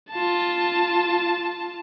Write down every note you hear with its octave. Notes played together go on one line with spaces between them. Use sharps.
F4 A5